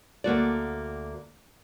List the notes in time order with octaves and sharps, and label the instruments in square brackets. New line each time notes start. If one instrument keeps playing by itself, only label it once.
[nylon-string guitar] D2 A#3 F#4 D5